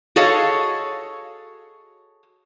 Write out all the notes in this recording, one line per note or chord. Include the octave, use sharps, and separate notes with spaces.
F#4 G#4 A4 C#5 D#5 F5